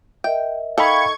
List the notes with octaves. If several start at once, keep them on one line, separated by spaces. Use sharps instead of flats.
A#4 D#5 E5 G5
D#4 A4 F5 G5 B5 C#6 G#6